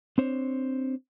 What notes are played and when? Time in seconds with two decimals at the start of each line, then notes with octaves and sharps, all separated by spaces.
0.18 C4 D4 C5 C#5